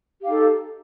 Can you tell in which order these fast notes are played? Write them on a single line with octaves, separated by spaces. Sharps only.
G4 F5 D#4 A4